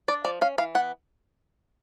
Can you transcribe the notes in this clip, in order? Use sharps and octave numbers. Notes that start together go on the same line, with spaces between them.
D4 D5
F3 D5
C#4 F5
E3 F5
B3 F#5